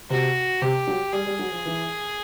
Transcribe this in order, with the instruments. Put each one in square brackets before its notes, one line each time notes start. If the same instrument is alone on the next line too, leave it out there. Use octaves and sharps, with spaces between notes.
[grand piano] C3 [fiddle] F#4
[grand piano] C3 [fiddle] G4
[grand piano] F#3
[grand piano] G3 [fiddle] G#4
[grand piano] G3
F#3
F3
E3